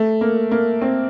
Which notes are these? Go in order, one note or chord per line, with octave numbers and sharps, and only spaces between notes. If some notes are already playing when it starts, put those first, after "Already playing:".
Already playing: A3
A#3
A#3
C4